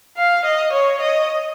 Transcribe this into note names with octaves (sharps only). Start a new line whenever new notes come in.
F5
D#5
C#5
D#5